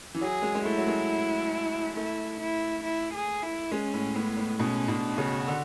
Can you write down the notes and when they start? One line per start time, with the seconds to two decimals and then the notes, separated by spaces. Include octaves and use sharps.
0.15 E3
0.21 F#3 G#4
0.42 G#3
0.55 G#3
0.65 A3 E4
0.78 F#3
0.87 G#3
1.96 A3 E4
2.40 E4
2.84 E4
3.14 G#4
3.43 E4
3.71 G#3 C#4
3.94 A2
4.16 A2 B3
4.37 A2
4.60 B2 C#4
4.88 B2 D4
5.18 C#3 F#4
5.48 D3